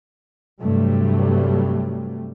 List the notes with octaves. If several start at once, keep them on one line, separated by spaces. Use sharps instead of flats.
G2 C3 F#3 G3 A3